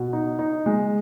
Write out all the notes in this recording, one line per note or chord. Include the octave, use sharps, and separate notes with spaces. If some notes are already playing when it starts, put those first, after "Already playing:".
Already playing: B2
D#4
D#4
G#3